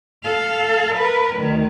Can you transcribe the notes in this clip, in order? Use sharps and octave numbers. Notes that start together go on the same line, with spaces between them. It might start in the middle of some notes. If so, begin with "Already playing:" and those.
A4 F5
A#4 B4
D2 D#3